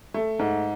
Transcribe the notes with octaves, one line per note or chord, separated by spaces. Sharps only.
A3
G#2